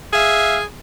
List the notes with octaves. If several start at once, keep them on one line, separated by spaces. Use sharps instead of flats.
G#4 E5 F5